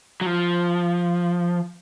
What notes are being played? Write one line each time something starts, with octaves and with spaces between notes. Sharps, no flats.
F#3
F3